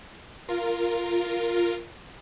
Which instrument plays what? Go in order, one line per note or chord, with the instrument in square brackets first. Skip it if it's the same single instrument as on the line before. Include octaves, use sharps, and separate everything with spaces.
[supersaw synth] F4 A#4